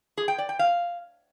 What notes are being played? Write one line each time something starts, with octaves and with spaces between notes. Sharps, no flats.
G#4
G5
D5
G5
F5